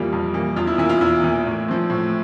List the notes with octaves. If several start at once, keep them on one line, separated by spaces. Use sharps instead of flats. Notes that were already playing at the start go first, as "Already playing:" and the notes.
Already playing: F2 E3 G3 A#3 F4
F2
E3 G3 A#3
E2 F4
E4
E3 A#3 E4
F4
E2 E4
E3 A#3
A2
F3 C4
A2